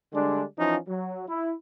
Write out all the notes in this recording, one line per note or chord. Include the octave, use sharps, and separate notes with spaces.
D3 G3 G#3 D4
E3 F3 C#4 D#4 F4
F#3
E4